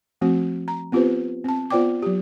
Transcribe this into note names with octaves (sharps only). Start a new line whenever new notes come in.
F3 A3 C4 F#4
A#5
B3 C4 F4 G4 B4 C5
C4 A5
B3 F4 C5 D5 G5 D6
F#3 G4